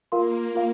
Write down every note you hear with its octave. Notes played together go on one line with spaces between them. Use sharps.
A#3 F4 A#4 F5 C6
F4 A#4 F5